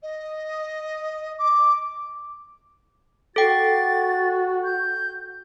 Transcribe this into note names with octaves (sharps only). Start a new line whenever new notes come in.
D#5
D6
F#4 A4 G5 A6
G6